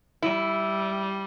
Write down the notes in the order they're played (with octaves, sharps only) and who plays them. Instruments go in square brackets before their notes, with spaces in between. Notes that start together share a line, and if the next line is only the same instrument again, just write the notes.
[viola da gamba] G3 [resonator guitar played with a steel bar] E4